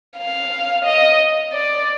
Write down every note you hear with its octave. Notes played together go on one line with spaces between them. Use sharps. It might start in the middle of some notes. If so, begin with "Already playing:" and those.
F5
D#5
D5